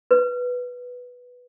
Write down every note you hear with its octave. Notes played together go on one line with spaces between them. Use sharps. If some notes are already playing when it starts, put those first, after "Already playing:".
B4